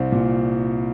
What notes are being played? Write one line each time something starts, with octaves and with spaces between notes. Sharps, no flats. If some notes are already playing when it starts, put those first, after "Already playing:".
Already playing: C2 C4
A#2